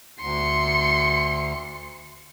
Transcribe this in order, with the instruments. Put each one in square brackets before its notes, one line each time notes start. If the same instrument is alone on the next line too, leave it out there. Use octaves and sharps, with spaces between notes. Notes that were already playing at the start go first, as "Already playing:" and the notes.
[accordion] D2 [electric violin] C6 C#7